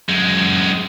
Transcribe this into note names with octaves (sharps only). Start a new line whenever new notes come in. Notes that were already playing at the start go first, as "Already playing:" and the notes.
F#2 G#3